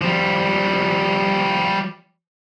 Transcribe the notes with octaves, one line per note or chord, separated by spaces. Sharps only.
F3 G3